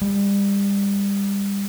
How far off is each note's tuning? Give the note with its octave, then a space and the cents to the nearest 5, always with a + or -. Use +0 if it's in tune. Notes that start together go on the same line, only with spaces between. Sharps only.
G3 +30